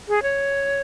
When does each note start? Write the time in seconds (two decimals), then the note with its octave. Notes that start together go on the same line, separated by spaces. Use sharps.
0.09 G#4
0.23 C#5